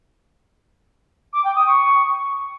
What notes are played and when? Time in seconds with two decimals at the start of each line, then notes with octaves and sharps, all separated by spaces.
1.32 D6
1.44 G5
1.55 D#6
1.66 C#6